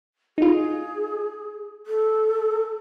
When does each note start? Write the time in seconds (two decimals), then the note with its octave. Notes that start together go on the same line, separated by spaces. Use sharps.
0.38 D#4 F4 G#4
1.86 A4